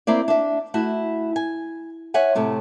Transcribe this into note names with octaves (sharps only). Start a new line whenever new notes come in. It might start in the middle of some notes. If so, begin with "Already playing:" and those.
A#3 C4 E4 D5
D4 E5
A3 E4 F#4
G#5
C#5 E5 F#5 G#5
A2 C3 A3